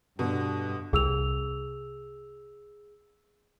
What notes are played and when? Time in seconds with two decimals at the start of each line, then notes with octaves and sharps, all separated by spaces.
0.19 G2 B2 D3
0.93 C2 G#4 E6 F7